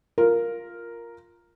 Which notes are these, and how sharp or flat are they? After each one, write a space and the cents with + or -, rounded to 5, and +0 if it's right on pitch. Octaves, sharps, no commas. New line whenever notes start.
F4 +0 A#4 +0